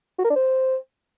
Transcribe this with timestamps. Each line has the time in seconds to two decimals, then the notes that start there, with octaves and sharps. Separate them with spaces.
0.19 F#4
0.24 A#4
0.30 D4
0.36 C5